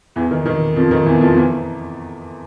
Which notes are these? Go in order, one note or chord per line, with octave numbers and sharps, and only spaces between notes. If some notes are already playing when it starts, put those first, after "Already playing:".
E2 E3
D#3
D#3
F2 F3
D#3
E2 E3
F2 F3
E2 E3